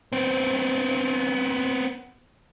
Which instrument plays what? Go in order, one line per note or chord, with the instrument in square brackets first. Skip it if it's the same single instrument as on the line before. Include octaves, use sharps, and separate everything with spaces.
[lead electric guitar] B3 C4